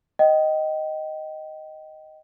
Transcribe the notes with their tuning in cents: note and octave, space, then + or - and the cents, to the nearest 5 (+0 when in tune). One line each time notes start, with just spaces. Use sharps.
D#5 +0 G5 -25